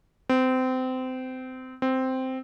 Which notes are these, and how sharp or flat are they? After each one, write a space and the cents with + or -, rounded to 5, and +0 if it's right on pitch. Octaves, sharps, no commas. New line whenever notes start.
C4 -25
C4 -5